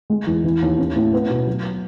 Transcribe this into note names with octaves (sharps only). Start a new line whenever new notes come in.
G#3
E2
E3
D#2
C#4
A2
B3
B2
F#3